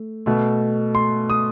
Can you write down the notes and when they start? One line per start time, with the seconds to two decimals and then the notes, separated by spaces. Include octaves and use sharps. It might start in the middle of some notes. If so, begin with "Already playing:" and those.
Already playing: A3
0.26 B2 A3
0.95 C6
1.30 D#6